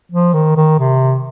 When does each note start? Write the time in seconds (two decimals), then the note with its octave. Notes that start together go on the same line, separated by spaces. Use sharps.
0.12 F3
0.34 D#3
0.57 D#3
0.79 C3